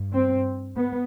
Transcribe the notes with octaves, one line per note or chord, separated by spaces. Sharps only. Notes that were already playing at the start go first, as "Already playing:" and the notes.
Already playing: G2
C4
B3